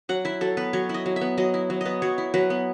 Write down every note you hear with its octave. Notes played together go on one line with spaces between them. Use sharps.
F#3 F#5
E4 E5
F#3 A4
B3 B4
F#3 C#5
E4 D#5
F#3
E5
B3
F#3 D#5
E4
F#3
B3 D#5
F#3 C#5
E4
F#3 B4
B3